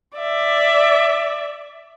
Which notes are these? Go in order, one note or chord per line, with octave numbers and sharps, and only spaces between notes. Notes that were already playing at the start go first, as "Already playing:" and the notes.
D5 E5